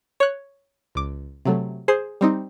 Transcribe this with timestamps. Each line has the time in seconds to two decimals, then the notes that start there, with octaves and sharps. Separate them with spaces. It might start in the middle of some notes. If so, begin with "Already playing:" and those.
0.20 C#5 F#6
0.95 C#2 D6
1.45 C3 F#3 A3
1.88 G#4 C5 C7
2.21 G3 C4 D#4